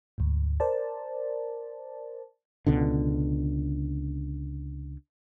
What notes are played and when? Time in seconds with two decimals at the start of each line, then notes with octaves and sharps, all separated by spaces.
0.18 D2 G#2
0.60 A#4 C5 D5 A5
2.66 C#2 B2 D3